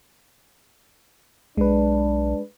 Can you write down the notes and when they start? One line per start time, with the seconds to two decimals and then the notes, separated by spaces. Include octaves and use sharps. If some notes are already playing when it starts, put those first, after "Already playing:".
1.57 B1 G#3 D4 B4